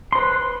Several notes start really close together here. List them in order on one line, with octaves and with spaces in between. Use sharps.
C6 C5 B4